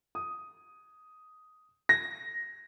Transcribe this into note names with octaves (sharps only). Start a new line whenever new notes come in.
D#6
A#6